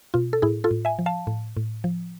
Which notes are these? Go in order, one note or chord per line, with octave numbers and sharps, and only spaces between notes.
B2 F4
A4
A2 E4 G#4
F4 A4
A2
E5 G#5
F3
F5 A5
A2
A2
F3